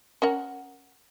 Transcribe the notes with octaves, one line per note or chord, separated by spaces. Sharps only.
C#4 A#4 F#5